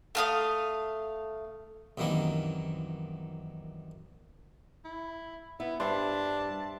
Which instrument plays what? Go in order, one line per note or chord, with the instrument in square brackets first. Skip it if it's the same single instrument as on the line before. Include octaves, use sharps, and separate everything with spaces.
[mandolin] A3 F5 D#6
[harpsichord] C2 F#2 D#3 E3 A#3
[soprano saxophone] E4
[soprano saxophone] B3 [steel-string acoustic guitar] E4
[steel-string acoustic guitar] G2 [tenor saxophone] D4 [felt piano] C5 E5 C6 [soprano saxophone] A5